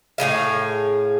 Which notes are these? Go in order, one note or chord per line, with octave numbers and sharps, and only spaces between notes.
A2 F#3 G#4 F5